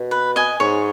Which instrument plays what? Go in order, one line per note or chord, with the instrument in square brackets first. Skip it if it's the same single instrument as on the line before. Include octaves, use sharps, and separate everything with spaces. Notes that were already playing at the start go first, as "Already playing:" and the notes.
Already playing: [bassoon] B2
[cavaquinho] B4
D#5 G#5
[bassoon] G#2 [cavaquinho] C#5